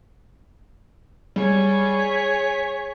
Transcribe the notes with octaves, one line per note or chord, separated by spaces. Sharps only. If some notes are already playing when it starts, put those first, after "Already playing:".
G3 G#4 C#5
B6